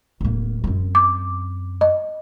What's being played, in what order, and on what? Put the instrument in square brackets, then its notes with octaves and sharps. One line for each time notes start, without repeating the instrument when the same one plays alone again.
[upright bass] D1 A#3
F#2 C4
[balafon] D6
D#5